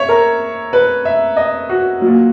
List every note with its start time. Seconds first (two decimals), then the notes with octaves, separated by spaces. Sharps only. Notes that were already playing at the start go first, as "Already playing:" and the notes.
Already playing: C#5 E5
0.09 A#4
0.73 B4
1.05 E5
1.37 D#5
1.69 F#4
2.01 F#3
2.06 A#2